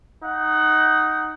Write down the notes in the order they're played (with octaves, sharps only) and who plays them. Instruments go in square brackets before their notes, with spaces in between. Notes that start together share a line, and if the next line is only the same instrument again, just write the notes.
[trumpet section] D#4 F#5